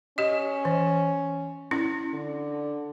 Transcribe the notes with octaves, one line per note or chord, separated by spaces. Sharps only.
C#4 G4 D#5
E3
C#4 E4
D3